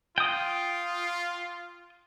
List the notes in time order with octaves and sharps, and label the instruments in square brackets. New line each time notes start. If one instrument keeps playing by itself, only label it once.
[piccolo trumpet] F4 [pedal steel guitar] G5 D#6